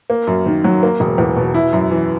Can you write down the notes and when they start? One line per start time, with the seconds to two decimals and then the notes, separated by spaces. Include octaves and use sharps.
0.10 A#3
0.27 F#2
0.46 D#3
0.64 F#3
0.83 A#3
1.00 E1
1.18 E2
1.36 B2
1.54 E4
1.73 F#2
1.91 E3